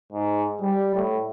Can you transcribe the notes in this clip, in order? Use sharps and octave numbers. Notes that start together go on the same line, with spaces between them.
G#2
G3
A2